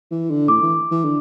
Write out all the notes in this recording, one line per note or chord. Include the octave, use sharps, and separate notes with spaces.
E3
D3
A2 D6
E3
E3
D3